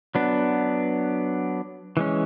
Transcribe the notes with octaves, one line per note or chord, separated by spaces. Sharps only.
F#3 B3 D4
E3 G#3 C#4